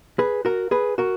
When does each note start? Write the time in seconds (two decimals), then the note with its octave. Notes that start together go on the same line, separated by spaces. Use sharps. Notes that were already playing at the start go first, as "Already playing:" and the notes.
0.19 G#4 B4
0.45 F#4 A#4
0.71 G#4 B4
0.98 F#4 A#4